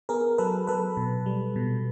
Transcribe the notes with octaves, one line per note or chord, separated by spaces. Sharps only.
B3 G#4 A#4
F#3 A4 B4
F#3 A4 B4
B2
G3
B2